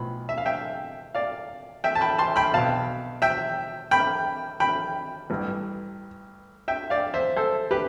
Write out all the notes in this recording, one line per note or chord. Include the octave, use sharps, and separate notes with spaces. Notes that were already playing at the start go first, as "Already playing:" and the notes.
Already playing: B1 A2 F3 B5
E5
F5
E5 G5
D5 F5
E5 G5
A5
G5 B5
A5 C6
G5 B5
B1 B2 F5 A5
E5 G5
G5 B5
G5 B5
A1 G2 E3
E5 G5
D5 F5
C5 E5
A4 C5
G4 B4